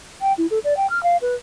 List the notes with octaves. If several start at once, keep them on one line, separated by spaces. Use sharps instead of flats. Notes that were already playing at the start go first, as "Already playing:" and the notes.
G5
E4
A4
D5
G5
F6
F5
B4